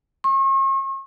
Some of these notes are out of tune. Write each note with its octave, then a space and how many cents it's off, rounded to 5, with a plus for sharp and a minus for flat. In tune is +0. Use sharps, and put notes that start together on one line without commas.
C#6 -45